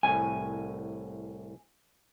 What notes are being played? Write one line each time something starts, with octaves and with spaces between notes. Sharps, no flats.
C2 A2 G#5